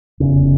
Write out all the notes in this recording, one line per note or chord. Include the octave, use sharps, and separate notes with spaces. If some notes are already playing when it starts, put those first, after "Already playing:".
F1 E2 C#3